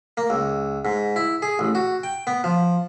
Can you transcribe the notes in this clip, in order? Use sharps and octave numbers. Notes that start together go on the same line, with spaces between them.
A#3
C#2
G#2
E4
G#4
A1
F#4
G5
B3
F3